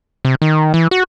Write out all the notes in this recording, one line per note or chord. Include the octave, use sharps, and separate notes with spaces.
C3
D#3
E3
F#4